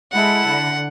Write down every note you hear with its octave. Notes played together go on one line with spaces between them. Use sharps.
G#3 E4 A4 F#5
D3